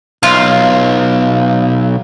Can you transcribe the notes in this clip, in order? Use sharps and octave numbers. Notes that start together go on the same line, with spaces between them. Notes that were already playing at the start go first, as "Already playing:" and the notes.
B1 F4